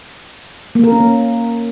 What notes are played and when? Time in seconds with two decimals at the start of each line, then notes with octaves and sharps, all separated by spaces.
0.75 A#3
0.84 A#4
0.92 C#4
1.00 A#3